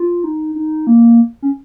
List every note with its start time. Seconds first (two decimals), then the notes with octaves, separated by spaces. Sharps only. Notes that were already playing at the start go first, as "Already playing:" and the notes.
Already playing: F4
0.24 D#4
0.55 D#4
0.87 A#3
1.42 C#4